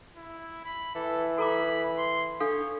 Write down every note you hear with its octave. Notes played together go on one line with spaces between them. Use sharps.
E4
B5
E3 A4
A4 A#5 B5 D6
C6
D4 A4 C#5 F5